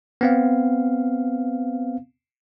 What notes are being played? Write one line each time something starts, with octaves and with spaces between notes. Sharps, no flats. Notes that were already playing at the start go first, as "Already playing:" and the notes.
B3 C4 F5